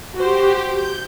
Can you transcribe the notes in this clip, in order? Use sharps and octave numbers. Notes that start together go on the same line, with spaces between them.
F#4 G4 C5
G6